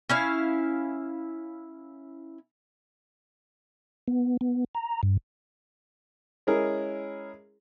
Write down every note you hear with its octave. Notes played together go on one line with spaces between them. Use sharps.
C#4 E4 F5
B3
B3
A#5
G2
G#3 C#4 E4 G#4 A#4